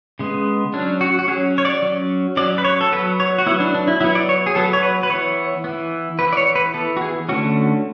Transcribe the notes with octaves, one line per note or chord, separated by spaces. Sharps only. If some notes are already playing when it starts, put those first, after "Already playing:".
C#3 G#3 B3
F#3 C#4 D4
F#4
F#4
F#3 C#4 G#4
C#5
D5
F#3 C#4
F#3 C#4 D5
B4
C#5
A4
F#3 B3 B4
C#5
F#4
F#3 B3 E4
D4
D4
E4
F#3 B3 E4
D5
C#5
G#4
F#3 B3 A4
C#5
B4
B4
E3 B3 C#5
E3 B3
E3 B3 B4
D5
C#5
B4
E3 B3 A4
F#4
G#4
D3 A3 C#4 F#4